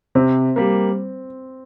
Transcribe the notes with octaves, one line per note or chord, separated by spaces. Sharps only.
C3 C4
G3 A#3